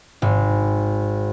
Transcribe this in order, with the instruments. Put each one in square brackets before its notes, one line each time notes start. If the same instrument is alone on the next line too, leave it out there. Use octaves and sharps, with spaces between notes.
[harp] G#1